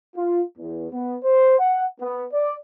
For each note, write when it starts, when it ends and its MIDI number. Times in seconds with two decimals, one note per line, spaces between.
0.16 0.42 65
0.58 0.87 40
0.91 1.18 59
1.24 1.58 72
1.59 1.84 78
2.01 2.25 59
2.33 2.56 74